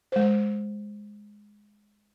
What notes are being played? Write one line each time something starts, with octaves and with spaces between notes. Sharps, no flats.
G#3 C5